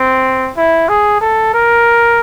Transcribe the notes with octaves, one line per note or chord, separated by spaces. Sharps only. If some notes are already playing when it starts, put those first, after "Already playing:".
Already playing: C4
E4
G#4
A4
A#4